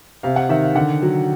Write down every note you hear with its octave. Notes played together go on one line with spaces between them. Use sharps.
C3 F5
F#5
D#3 E5
F5
D3 F#5
F#3